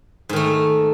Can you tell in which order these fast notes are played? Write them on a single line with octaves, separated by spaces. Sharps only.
G#2 D#3 A3